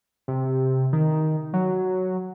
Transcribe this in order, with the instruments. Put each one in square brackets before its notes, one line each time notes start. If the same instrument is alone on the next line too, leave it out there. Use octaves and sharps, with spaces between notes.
[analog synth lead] C3
D#3
F#3